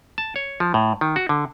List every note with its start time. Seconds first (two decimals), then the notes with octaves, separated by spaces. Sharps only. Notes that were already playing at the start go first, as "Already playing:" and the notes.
0.18 A5
0.36 C#5
0.60 F3
0.74 A2
1.01 D#3
1.16 F#4
1.29 D3